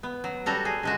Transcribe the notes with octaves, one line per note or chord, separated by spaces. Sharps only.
B3
F#3
G3 F#4 A4 A#5
G#4
D3 G#3 F#4